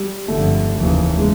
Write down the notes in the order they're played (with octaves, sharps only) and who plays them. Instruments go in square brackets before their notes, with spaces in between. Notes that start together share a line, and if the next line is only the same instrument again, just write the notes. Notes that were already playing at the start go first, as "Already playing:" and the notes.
Already playing: [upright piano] G3
[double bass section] G1 F2 D3 [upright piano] A3
[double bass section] F1 D#2 C#3 E3
[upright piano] G#3